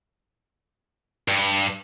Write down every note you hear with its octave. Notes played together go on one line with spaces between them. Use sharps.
G2